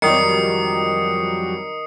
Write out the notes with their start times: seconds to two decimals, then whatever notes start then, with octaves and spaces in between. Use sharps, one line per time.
0.02 F2 D#3 F#3 G3 D#6 C7 C#7